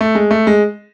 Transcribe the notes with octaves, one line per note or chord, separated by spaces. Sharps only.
A3
G#3
A3
G#3